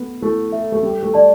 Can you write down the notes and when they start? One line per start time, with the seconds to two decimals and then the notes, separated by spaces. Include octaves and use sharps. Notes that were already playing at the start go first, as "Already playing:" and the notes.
Already playing: A3 B3
0.21 A3 E4
0.52 A4 E5
0.72 A3
0.82 G3 A4
1.03 A3
1.14 D5 A5